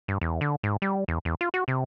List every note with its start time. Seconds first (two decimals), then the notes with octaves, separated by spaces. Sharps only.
0.08 G2
0.21 E2
0.41 D3
0.63 G#2
0.82 G3
1.08 E2
1.25 E2
1.41 F4
1.54 F#4
1.68 C3